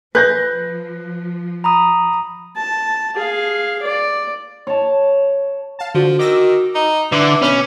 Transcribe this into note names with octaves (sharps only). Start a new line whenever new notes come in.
F3 B4 F#6 G6 A#6
A#5 B5 D#6
A5
G#4 F5
D5
C#5 A5
F5 A5
D3 F3 F#4
D#3 D6 E6 A#6
D#4
D3 E3 D6
B2 C#4 B4 B5